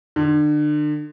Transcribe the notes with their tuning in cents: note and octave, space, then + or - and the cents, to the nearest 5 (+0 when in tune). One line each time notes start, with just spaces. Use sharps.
D3 +35